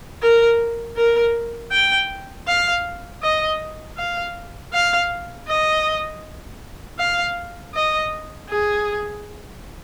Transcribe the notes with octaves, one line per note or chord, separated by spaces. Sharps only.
A#4
A#4
G5
F5
D#5
F5
F5
D#5
F5
D#5
G#4